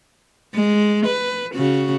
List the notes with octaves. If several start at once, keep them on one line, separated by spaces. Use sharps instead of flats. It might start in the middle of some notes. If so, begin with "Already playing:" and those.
G#3
B4
C#3 F#4